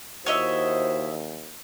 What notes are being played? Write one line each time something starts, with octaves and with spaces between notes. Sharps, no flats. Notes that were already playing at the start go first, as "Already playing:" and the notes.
D#2 E4 F#4 C5 C#5 D#5 E5